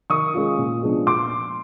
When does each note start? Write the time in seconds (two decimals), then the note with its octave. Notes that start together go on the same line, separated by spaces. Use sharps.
0.10 D#3 C#6 D#6
0.34 G#3 C#4 F4
0.58 A#2
0.82 F3 G#3 B3 D4
1.06 A#2 C6 D6